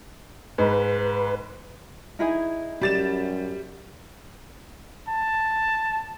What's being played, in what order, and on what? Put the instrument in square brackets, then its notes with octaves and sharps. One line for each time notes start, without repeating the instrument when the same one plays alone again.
[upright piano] G#2 [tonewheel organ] B4
[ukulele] D#4 E4 G#4
[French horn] F#2 [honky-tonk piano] G3 A6 E7
[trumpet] A5